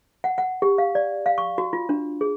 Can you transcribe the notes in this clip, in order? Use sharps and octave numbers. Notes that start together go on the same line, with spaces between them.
F#5
F#5
G4
F5
D5
F5
C#6
F#4
F4
D4
G#4